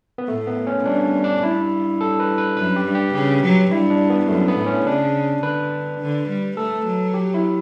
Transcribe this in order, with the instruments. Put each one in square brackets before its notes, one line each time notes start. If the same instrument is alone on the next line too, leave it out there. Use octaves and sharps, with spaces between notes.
[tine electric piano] B3
[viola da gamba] A2 [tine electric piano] A3
[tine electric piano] B3
C#4
[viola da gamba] G2 [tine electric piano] D4
[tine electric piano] D4
[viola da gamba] G2 [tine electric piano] E4
[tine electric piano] A4
B4
B4
[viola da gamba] F#2 [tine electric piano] B4
[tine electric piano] G4
[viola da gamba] G2
[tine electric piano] G4
[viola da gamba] C#3 [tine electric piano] G4
[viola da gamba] F#3
[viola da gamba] G2 [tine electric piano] E4
[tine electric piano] D4
B3
[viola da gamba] F#2 [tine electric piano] A3
[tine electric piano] B3
[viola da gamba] A2
[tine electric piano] C#4
[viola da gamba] C#3 [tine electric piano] D4
[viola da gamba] D3 [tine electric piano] B4
[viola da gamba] D3
G3
[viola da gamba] A3 [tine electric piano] A4
[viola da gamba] F#3
[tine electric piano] G4
E4